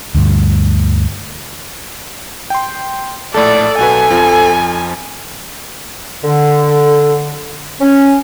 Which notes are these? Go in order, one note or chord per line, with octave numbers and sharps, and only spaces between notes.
D2 G2
G5 C6
A#1 A2 A4 D5
B1 F#4 B4 G#5
F2 F3
D3
C#4